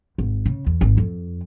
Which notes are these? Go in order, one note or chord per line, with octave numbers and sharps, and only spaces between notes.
G#1
C#3
E2
G#1
F2